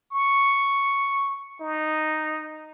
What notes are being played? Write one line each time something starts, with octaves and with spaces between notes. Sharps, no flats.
C#6
D#4